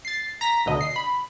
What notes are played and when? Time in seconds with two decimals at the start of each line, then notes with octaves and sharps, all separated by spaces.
0.05 A6 C7
0.41 A#5 A#6 B6
0.66 D2 B2 D3 D#5
0.81 C7
0.96 B5